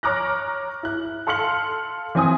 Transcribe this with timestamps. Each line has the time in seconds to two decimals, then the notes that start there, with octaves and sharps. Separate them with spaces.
0.03 C#5 A#5 D6 F6 F#6 A#6
0.83 E4 F#6
1.27 A4 F5 C6 F6 C#7 F#7
2.15 E3 C4 G#5 D#6